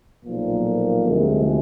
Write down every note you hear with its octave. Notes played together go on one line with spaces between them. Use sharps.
B1 A#2 F3 A#3
D2 C3 F3 G#3